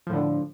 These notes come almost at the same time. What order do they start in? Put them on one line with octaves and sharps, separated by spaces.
F3 A2 D3